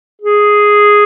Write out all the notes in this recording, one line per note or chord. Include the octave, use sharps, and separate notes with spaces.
G#4